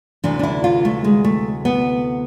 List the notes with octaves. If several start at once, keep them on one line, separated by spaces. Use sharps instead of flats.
D2 C3 E3 D4
D4
E4
F4
A3
G#3
A3
B3